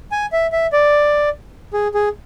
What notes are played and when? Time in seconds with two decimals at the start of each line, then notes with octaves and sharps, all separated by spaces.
0.12 G#5
0.33 E5
0.53 E5
0.73 D5
1.74 G#4
1.94 G#4